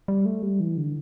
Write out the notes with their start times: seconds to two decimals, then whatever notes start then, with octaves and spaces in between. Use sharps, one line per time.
0.08 G3
0.26 A3
0.43 G3
0.60 E3
0.77 D3